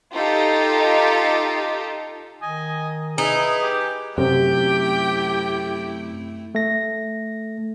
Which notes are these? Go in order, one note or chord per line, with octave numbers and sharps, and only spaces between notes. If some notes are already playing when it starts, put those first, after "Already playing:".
D#4 F4 G4 A4
D#3 D#5 G#5
D#4 E4 G#4 B4
G4
F#2 C3 A3 E4 G4 G5
A3 A#6